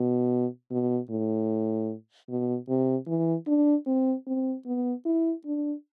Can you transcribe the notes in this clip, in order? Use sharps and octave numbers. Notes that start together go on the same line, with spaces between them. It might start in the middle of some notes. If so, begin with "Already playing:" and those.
Already playing: B2
B2
A2
B2
C3
E3
D4
C4
C4
B3
E4
D4